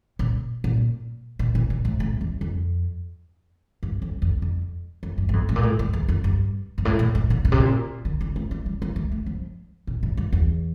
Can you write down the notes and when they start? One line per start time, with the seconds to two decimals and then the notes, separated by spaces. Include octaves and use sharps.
0.19 A#2
0.64 A#2
1.39 A#2
1.55 A#2
1.70 A#2
1.85 A2
2.00 A2
2.21 E2
2.41 F2
3.83 G2
4.02 F2
4.22 F2
4.42 F2
5.03 F2
5.18 G2
5.29 G2
5.33 F2
5.49 A2
5.56 A#2
5.63 A2
5.79 G2
5.93 E2
6.08 F2
6.24 G2
6.78 G2
6.85 A2
6.99 A#2
7.15 A#2
7.30 A2
7.45 A#2
7.52 C3
7.60 A#2
8.05 D3
8.21 D3
8.36 A3
8.51 A3
8.66 G3
8.82 A#3
8.96 A3
9.12 A3
9.26 F3
9.87 A#2
10.03 A2
10.17 G2
10.32 E2